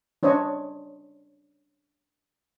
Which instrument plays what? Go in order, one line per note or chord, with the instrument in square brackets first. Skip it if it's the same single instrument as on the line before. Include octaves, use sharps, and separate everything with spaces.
[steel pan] C#4 D4 C5 C#5 D#5